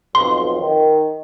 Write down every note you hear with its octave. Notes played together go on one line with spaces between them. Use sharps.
B1 F2 C6
D#3